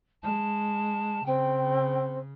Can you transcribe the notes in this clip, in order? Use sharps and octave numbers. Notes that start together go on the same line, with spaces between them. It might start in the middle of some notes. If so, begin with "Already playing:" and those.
G#3 A5
C#3 C4 G5